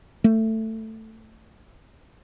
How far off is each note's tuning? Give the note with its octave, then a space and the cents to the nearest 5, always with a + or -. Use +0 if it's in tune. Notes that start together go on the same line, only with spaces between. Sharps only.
A3 +10